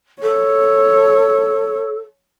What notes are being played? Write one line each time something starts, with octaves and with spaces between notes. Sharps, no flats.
A4 C#5